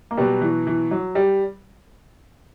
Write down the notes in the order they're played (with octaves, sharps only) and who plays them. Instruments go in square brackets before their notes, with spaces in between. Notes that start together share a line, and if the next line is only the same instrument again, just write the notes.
[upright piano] A#3
[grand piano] B2 F#3 B3 [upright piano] G3
[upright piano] E3
E3
F#3
G3